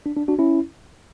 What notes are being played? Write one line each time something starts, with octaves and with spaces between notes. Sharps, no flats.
D4
D4
D4 F#4
C#4 E4